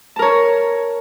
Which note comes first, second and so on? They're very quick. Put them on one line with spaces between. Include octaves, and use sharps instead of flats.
A5 A#4 C#5